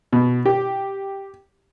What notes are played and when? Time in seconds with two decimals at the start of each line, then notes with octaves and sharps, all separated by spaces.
0.13 B2
0.46 G4